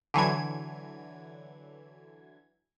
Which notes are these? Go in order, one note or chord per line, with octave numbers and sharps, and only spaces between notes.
D3 E3 F#3 G#6